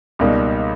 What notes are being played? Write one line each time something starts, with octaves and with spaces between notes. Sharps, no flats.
C#2 B2 G3 A#3 D#4